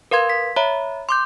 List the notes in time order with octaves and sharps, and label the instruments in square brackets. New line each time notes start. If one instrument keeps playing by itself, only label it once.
[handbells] A#4 B4 F5 C6 G#6
B6
C#5 E5 A#5 B5
C6 D6 G6